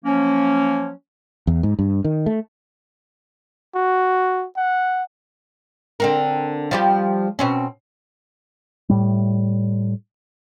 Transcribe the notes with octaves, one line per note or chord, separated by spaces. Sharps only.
F3 F#3 A#3 C#4
E2
G#2
G2
D#3
A3
F#4
F#5
D3 C4 A#4
F3 G3 G4
B2 C4 C#4
A2 G3